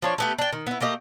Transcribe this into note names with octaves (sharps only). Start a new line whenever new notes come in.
F3 D4 C#5
A3 B3 G4
D4 G5
D#3
B3 E4
A3 A#3 G4 D#5